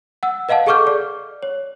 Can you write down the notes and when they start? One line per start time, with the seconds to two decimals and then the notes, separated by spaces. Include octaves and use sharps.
0.23 F#5 E6
0.49 B4 D#5 F5 F#5 A5
0.67 G#4 A4 C#6 D6 F6 G6
0.87 D5
1.43 C#5